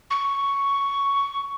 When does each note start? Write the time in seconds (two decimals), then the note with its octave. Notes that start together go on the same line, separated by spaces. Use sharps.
0.10 C#6